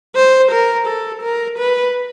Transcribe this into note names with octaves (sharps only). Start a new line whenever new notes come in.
C5
A#4
A4
A#4
B4